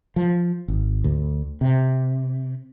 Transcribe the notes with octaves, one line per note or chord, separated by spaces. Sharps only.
F3
G#1
D2
C3